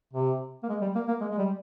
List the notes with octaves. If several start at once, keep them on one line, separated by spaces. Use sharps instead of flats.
C3
A#3
G#3
G3
A#3
A#3
G#3
G#3
G3